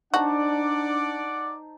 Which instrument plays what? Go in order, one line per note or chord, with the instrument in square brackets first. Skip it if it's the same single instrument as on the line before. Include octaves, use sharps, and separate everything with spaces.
[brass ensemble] D4 [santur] D#4 C5 A5 [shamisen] F#4 [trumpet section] D5 F#5 D6